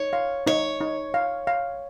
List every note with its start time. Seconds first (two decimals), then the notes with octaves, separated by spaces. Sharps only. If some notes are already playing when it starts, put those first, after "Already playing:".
Already playing: D#4 C#5
0.13 F5
0.47 D#4 C#5
0.80 D#4
1.14 F5
1.47 F5